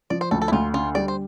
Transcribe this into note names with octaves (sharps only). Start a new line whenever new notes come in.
F3 D5
C5
D2 A4
A4
E4
D2 F4
D3 F4
G3 D5
C5